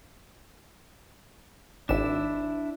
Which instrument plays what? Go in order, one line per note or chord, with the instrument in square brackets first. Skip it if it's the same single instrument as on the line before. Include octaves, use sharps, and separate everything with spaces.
[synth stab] G#1 E7 [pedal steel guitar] D4 E4